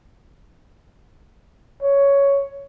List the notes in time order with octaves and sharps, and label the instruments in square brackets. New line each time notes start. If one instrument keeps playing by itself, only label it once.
[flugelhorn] C#5